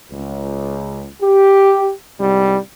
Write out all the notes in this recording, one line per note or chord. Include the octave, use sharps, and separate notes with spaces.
C#2
G4
C2 G#2 G3